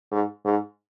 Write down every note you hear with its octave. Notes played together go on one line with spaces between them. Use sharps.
G#2
G#2